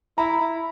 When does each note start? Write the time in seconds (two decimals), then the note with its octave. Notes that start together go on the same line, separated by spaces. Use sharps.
0.18 E4 A#5
0.40 E4